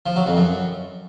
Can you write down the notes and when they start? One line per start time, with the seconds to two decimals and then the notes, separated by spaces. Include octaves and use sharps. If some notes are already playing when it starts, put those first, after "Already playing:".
0.06 F3
0.16 F#3
0.27 F2
0.37 F#2